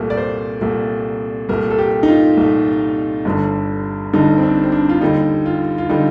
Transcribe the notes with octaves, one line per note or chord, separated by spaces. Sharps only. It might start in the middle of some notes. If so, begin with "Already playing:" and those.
Already playing: C2 A#2 A3 A#4
D5
C5
C2 A#2 A3
C2 A#2 A3 A#4
A4
G4
D#4
F4
C2 A#2 A3
G1 G2 D3
G1 G2 D3 D#4
C4
D4
C4
D4
F4
D#2 D3 G3 D#4
F4
F4
D3 G3 D#4